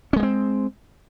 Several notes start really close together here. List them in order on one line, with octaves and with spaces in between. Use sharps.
C#4 G#3 A#3 C4